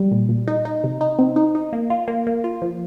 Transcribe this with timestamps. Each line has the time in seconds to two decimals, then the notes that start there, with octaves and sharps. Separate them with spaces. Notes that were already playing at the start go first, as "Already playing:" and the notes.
Already playing: G3
0.12 A#2
0.29 A#2
0.48 D#4
0.65 D#4
0.84 C3
1.01 D#4
1.19 C4
1.36 D#4
1.55 D#4
1.73 A#3
1.90 F4
2.08 A#3
2.27 A#3
2.44 F4
2.62 F3